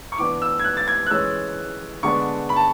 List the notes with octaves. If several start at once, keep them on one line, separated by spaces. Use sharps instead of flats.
C#6
E3 B3 D4 D6
E6
G#6
F#6
A6
G#6
F#6
E3 G#3 C#4 E6
D3 G#3 B3 D4 C#6
B5
A5